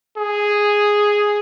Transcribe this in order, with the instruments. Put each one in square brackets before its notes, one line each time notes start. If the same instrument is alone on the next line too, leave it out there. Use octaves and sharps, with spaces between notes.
[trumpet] G#4